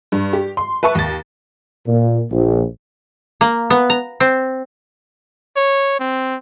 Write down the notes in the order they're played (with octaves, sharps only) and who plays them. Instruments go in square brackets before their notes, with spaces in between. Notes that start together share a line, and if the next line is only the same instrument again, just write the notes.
[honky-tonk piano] G2
G4
C6
B4 E5 A5 C#6
D#2 A6
[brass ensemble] A#2
A#1
[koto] A#3
B3
A#5
C4
[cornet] C#5
C4